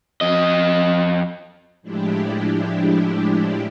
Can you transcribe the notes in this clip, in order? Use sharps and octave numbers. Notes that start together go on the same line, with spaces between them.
F2 D#5
A2 F3 G#3 D4 E4 G4